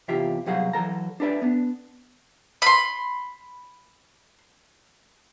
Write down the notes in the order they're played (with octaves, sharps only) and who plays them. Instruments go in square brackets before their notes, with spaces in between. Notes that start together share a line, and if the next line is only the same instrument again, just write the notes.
[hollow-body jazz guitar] E2 C3 F4 G4 E5
C2 B2 F#3 G#4 F5 F#5
E3 F#3 A4 A#5
D4 A4 B4 D5 E5
B3 D4
[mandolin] B5 C6